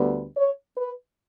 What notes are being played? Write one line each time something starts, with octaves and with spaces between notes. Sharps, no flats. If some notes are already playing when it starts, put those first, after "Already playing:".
Already playing: D2 D3 G3 B3
C#5
B4